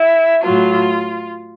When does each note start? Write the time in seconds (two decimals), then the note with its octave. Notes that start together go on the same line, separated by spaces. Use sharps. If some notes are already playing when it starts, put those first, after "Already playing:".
Already playing: E4
0.43 A2 F#3 F4